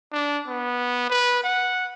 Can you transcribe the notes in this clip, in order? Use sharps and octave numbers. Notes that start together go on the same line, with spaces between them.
D4
B3
B4
F#5